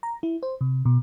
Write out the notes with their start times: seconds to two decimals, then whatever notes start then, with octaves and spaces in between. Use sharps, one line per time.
0.03 A#5
0.23 E4
0.43 C5
0.61 C3
0.85 B2